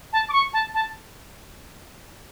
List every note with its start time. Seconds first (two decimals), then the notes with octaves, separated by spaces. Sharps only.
0.13 A5
0.29 D6
0.33 C#6
0.53 A5
0.74 A5